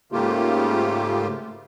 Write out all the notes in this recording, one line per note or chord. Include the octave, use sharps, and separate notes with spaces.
G#2 C#3 A3 A#3 F4 G4